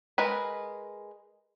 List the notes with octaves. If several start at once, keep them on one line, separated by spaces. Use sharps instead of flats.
G#3 A#4 B4